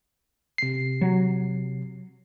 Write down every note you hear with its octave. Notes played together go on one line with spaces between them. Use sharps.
C3 C7
F#3